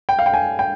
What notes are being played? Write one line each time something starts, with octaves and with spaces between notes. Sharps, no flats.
G5
F5
G5
G#5
G5